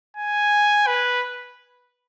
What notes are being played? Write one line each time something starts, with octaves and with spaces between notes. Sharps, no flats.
G#5
B4